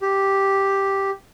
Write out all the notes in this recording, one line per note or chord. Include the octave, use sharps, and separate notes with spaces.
G4